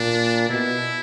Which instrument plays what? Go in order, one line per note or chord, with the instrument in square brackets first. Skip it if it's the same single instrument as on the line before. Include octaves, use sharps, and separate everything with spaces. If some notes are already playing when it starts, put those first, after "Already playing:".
Already playing: [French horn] A#2 [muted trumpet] D4
[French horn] B2 [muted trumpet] E4